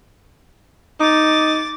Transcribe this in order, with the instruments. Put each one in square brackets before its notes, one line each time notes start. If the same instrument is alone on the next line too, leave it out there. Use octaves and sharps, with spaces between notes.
[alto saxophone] D#4 [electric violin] D6 A6